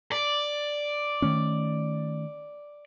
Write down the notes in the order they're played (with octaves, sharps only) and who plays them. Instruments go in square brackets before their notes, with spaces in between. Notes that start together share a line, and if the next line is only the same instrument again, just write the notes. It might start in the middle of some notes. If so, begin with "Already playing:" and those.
[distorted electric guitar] D5
[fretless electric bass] D#3 A3 C#4